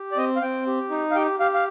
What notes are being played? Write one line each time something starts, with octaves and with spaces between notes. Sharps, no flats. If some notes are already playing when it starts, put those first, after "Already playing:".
Already playing: G4
D5
C4 D#5
F5
C4 G5
G4
D#4
F5
G4 G5
G4 F5
F5